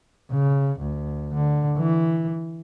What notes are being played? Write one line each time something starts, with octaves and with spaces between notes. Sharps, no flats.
C#3
D2
D3
E3